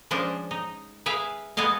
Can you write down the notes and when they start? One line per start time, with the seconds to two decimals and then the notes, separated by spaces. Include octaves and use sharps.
0.11 F3 G#3 C#4 D4 C5
0.51 D#4
1.06 G#4 B4 E5 F5 G#5
1.57 G#3 B3 G#4 A4 D#5 F5